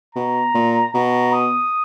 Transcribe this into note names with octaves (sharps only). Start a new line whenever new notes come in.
B2 A#5
A#2
B2 A#5
D#6